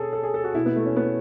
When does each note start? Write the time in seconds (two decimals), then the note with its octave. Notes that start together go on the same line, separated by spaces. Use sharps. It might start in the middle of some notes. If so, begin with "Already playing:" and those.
Already playing: B2 C#4 G#4 A4
0.13 A4
0.23 G#4
0.34 A4
0.44 F#4
0.54 B2 E4
0.66 B3
0.76 A3
0.86 C#4
0.96 B3